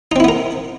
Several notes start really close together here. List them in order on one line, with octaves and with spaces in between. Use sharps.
D#4 C4 E4 B3 A#4